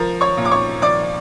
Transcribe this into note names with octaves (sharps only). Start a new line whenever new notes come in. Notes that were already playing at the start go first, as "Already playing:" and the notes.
Already playing: F3 A#4 A#5
C#5 C#6
A#2
D6
C#5 C#6
F3 D5 D6